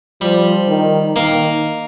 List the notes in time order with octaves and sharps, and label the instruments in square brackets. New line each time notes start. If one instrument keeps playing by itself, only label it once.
[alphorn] F3 [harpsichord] G3
[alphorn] D#3
[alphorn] D#3 [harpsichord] A#3